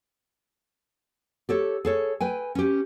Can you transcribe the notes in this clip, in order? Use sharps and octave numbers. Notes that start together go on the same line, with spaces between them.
G4 A4 C#5
G#4 A4 C#5
B4 G5 G#5
C#4 G4